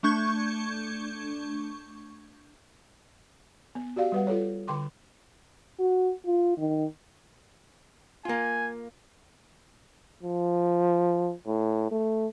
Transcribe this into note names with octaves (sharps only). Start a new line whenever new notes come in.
A3 D4 C#6 G6 G#6
B3
F#4 G4 D5 F5
G3 B4 F#5
F4 A4 C#5
D3 G5 C6 D6
F#4
F4
D#3
A#3 F4 G#5
F3
A2
A3